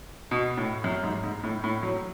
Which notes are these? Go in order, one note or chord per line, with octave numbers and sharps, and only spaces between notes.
B2
A2
F#2
G#2
G#2
A2
A2
F#3